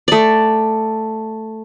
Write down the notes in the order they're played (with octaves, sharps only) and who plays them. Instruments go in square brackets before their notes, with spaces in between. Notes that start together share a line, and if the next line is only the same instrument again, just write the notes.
[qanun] A3 D5